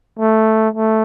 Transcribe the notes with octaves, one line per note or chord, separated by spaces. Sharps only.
A3
A3